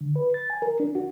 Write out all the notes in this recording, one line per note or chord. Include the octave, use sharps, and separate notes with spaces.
D3
B4
A6
G#5
A#4
D4
F#4